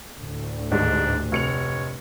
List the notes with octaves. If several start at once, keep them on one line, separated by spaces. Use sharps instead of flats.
D2 A2 D3
D#2 G#2 D4
F1 C#5 C#7 F7